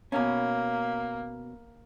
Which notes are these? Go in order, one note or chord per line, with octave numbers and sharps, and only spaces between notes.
B2 A#3 C#4